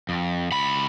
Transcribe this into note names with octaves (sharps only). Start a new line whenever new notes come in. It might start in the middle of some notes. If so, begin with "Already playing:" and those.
F2
C#2 B5